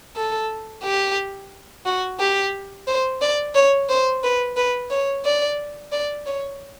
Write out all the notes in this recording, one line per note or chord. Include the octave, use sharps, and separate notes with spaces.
A4
G4
F#4
G4
C5
D5
C#5
C5
B4
B4
C#5
D5
D5
C#5